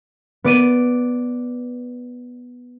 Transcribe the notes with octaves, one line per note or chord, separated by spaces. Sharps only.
B3 D5 D#7